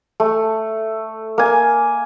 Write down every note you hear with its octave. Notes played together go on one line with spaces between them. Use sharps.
A3
A#3 G#5